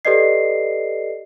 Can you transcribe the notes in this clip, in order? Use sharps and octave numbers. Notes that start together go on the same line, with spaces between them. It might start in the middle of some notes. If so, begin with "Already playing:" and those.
G4 A4 B4 D5 D#5 C7